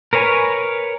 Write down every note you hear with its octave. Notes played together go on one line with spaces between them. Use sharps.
A#4 B4 C#5 G#5